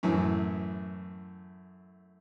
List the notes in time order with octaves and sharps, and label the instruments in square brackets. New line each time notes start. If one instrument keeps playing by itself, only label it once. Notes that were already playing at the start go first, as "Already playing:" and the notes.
[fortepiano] F#2 A2 E3